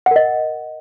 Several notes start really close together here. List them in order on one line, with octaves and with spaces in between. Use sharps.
F#5 A#4 D#5